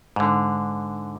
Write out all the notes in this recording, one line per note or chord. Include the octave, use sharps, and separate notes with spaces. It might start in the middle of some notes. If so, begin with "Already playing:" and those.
G#2 D3